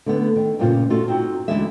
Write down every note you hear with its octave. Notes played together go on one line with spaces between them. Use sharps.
D3 A3 B3
D#3
G2 A#2 C#3 F4 C5
A3 F4 F#4 A4
C4 D#4 F#4
D2 D3 E3 G#3 E5